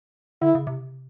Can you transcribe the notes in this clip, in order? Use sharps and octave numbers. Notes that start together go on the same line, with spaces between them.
D3 E4
C#3
C3